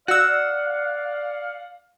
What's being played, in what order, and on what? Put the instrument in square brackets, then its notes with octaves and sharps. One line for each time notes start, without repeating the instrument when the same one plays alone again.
[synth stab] F#4 E6 [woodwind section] D5 F5 [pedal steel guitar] F#5